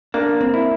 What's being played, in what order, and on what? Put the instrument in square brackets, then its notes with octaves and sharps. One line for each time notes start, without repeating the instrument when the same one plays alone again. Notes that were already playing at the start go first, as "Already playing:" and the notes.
[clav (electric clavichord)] A#3 [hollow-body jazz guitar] D4
[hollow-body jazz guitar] C4
[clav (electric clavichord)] E4